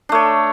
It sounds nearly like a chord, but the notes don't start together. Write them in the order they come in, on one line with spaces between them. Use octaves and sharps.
D4 A3 C#5